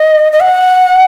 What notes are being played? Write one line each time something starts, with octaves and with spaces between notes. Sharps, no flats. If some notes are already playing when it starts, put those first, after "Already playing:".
Already playing: D#5
D#5
F#5